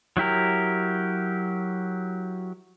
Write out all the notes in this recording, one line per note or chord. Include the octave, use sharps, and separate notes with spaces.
F#3 E4 G4 A#4